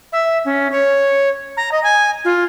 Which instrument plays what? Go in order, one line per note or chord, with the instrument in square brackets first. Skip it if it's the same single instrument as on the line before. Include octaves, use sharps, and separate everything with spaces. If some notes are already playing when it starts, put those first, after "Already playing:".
[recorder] E5
C#4
C#5
A#5
D#5
G#5
F4